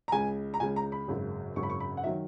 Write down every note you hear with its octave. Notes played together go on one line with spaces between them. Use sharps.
A#5
C#2 C#3 G#3 G#5
A#5
C#2 C#3 G#3 G#5
A#5
B5
G#1 F#2 C#3
G#1 F#2 C#3 C#6
B5
C#6
B5
F#5
D#3 F#3 E5